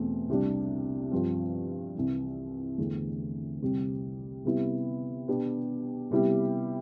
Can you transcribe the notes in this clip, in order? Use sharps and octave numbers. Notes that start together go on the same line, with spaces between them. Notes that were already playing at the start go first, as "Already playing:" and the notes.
Already playing: E2 B2 A3 C4
C2 C3 G3 D4
G2 F3 C4
C2 C3 E3
E2 D3 A3 C4
C2 C3 G3 C4
C3 G3 B3 E4
B2 B3 D4 G4
C3 G3 B3 E4 G4